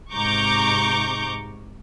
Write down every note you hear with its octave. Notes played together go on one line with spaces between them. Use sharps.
G#2 C3 A#5 C#6 D6 G6